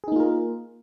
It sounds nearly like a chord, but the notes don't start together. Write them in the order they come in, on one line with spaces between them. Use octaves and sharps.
G#4 D#4 A#3 F4 A#4